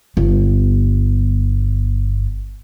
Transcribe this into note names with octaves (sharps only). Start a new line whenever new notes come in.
G1 B3